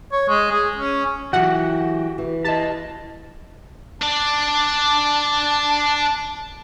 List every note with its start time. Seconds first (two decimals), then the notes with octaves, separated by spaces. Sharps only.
0.12 C#5
0.29 G#3
0.52 G#4
0.77 C#4
1.33 E3 F#3 F#4 G4 F#5
2.18 E3
2.44 G4 D#5 A5
4.02 D4 D5 A5